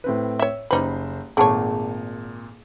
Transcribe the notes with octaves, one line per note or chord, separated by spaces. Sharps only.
A2 C4 B4
C#5 E5
F#1 G3 D#4 B4 C5
G#1 A#2 A3 G#4 C#5 F#5 A5